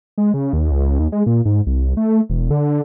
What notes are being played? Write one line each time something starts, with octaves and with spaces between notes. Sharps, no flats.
G#3
C#3
D#2
C#2
D#2
G#3
A#2
G#2
C2
A3
E1
D3